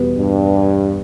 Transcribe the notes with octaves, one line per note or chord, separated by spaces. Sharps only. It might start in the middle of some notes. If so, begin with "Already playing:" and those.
Already playing: E2 B2 G3 B3
G2